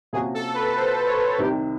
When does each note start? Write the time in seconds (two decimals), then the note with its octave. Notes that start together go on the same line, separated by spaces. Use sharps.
0.13 C3 F3 A#3 C#4 F#4 G#4
0.34 A4
0.54 B4
0.76 C5
1.07 C#5
1.38 C2 C3 D#3 G4